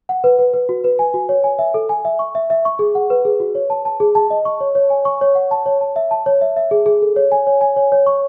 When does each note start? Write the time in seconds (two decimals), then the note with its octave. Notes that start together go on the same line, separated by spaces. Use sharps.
0.09 F#5
0.24 B4
0.39 B4
0.54 B4
0.69 F#4
0.84 B4
0.99 G#5
1.14 F#4
1.29 C#5
1.44 G#5
1.59 E5
1.74 A4
1.89 G#5
2.05 E5
2.19 C#6
2.35 E5
2.50 E5
2.65 C#6
2.79 G#4
2.95 F#5
3.10 B4
3.25 G#4
3.40 F#4
3.55 C#5
3.70 A5
3.85 A5
4.00 G#4
4.15 A5
4.30 D#5
4.45 C#6
4.60 C#5
4.75 C#5
4.90 G#5
5.05 C#6
5.21 C#5
5.35 F#5
5.51 A5
5.66 C#5
5.81 A5
5.96 E5
6.11 A5
6.26 C#5
6.41 E5
6.57 E5
6.71 G#4
6.86 G#4
7.02 A4
7.16 C#5
7.32 G#5
7.47 C#5
7.61 G#5
7.76 C#5
7.92 C#5
8.06 C#6